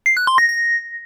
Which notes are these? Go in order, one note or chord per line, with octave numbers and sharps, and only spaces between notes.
C7
F#6
C6
A#6
A#6